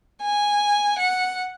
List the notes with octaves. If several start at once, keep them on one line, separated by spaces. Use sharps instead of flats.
G#5
F#5